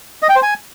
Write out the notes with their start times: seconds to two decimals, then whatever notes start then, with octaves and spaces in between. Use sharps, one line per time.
0.22 D#5
0.29 G5
0.36 C5
0.42 G#5